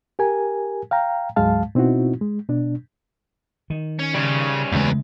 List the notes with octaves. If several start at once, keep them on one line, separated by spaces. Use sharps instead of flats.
G4 A#4 G#5
F5 G5 A#5
D2 G#2 F#3 G#3 F5 A5
B2 C4 D#4 E4 F#4
G#3
B2 D4
D#3
C#4
C#3 G3 C#4
E2 C#3 G#3 A3 B4